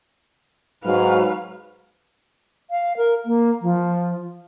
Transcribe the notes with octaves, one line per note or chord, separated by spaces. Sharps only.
G#2 F#3 B4 F5
F5
A#4
A#3
F3